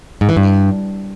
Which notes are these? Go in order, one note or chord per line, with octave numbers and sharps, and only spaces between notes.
G#2
E3
G2